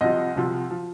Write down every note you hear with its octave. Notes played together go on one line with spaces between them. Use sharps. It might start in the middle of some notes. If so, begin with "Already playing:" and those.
C2 C3 F3 D#5
C2 C3 F3
F3